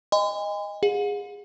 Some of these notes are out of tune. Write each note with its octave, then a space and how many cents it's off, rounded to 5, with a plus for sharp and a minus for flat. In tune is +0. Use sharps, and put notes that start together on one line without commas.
D#5 +0 G#5 -40 C6 -45
G#4 -20 F#5 -45